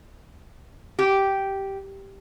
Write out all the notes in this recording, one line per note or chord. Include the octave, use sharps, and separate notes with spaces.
G4